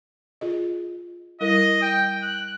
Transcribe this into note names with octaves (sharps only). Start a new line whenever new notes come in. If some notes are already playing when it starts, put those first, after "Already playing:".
F4 G#4 D#5
G3 E4 A#4 D#5
G5
F#6